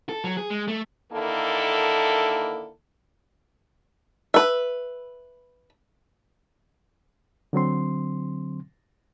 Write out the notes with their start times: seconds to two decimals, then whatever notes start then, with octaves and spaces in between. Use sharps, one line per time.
0.09 A4
0.24 F#3
0.37 G#4
0.50 G#3
0.68 A3
1.13 D3 D#3 A#3 E4 A4
4.34 B4 E5
7.53 D3 F#3 C4 C6